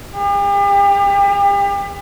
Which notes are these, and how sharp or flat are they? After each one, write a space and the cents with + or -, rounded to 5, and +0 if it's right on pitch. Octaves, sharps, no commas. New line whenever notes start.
G4 +40